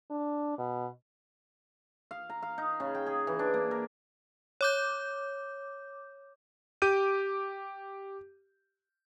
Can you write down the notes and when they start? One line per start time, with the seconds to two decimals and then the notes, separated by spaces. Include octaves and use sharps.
0.11 D4
0.58 B2
2.11 F5
2.30 A#5
2.43 F5
2.58 D#4
2.80 C#3
2.95 G5
3.06 G#4
3.27 E3
3.39 D4
3.54 A#3
3.71 A#4
4.61 C#5 D6 G6
6.82 G4 D6 G6 D#7